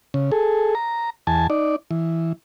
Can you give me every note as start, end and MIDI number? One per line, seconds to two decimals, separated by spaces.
0.14 0.31 49
0.32 0.74 68
0.32 0.74 69
0.75 1.10 82
1.27 1.47 40
1.27 1.47 80
1.27 1.47 81
1.50 1.76 63
1.50 1.76 74
1.91 2.33 52